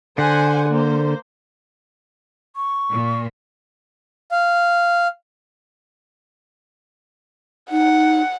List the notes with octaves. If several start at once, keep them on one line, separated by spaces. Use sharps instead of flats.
D3 C5 F#5 G#5
A#3 C5
C#6
A#2
F5
D#4 F#5